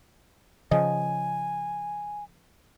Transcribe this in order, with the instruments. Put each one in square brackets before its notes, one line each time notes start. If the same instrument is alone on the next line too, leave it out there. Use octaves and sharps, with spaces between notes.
[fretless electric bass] C#3 F3 [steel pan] D#5 [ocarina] G#5